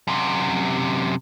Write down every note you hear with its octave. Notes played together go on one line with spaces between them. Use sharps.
F#2 C3